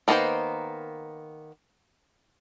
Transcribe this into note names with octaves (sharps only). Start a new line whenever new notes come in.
D#3 A#3 B3 E4 C5